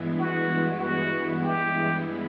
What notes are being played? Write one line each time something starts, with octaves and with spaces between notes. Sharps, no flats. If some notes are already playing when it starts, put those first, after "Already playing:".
Already playing: G2 E3 G#3 B3 E4
F#4
F#4
G4